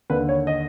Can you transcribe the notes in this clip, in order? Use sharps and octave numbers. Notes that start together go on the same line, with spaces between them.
D#2 D3 B4
C#5
D#5